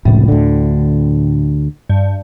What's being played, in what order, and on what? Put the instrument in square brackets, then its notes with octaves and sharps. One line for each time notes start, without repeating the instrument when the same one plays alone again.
[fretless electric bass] F1 C#2 [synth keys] A2
[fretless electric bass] D2 D3
[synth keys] G2